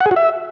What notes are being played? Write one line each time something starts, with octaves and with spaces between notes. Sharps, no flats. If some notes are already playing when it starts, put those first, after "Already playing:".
F#5
G#4
F#4
E5